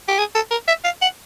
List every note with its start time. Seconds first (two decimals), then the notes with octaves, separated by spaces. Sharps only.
0.08 G4
0.18 G#4
0.35 A4
0.51 A#4
0.68 E5
0.84 F5
1.02 F#5